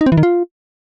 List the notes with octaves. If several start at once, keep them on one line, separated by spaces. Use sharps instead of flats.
D#4
C4
E3
D#3
F4